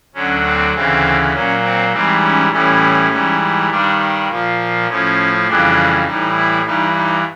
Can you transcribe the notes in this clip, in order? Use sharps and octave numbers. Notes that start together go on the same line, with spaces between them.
D2 D3 F#3 C#4
C4
D2 C#3 E3 C4
A#2 F#3 C#4
C4
G#2 E3 G3 C4
C#4
A2 E3 G3 C#4
G#2 E3 G3
G2 D#3 G3 D4
A#2 F3
A2 F3 C#4
F2 C#3 E3 G3 D4
A2 E3 G3 D#4
E4
G2 E3 G3 D#4
D#4